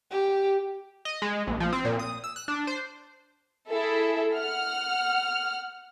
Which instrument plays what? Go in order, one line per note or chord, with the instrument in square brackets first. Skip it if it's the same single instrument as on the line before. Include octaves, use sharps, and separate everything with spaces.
[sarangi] G4
[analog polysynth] D#5
G#3
A#1
F3
C4
A#2
D#6
E6
F#6
D4
C5
[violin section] E4 G#4 A4 E5
F#5 F6